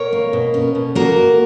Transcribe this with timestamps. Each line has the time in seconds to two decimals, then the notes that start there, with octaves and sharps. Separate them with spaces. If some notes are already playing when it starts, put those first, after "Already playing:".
Already playing: B2 A#4 C#5
0.13 A#3
0.33 B2
0.54 C#4
0.75 B2
0.95 A#3 F#4 A#4